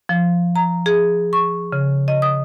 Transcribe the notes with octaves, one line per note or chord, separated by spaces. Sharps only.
F3
A#5
G#4
C#6
C#3
D#5
D#6